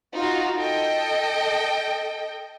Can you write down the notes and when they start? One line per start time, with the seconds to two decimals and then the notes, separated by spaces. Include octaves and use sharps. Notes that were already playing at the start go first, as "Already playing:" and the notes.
0.16 D#4 F4 F#4 F5
0.58 A4 D#5 G5